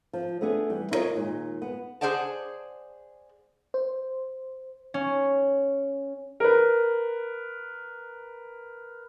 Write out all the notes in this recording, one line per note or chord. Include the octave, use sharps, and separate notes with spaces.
F3
A3 B3 D4 G#4
E3 G3
E4 F4 A#4 C5 C#5 D#5
D#2 A#2 G#3
B3
G#4 A#4 C5 D5 F#5 A5
C5
C#4
A#4 B4